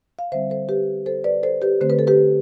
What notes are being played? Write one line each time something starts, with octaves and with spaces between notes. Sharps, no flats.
F5
D3 G3 C4 C5 E5
A4 C5
G4 B4
A4 C5
B4 D5
A4 C5
G4 B4
D3 A3 C4 C5
B4
A4
G4 B4